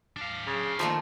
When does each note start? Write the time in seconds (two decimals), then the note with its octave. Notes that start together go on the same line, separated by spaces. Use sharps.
0.17 D4 F5
0.47 C#3
0.79 D#3 F3 A3 A#3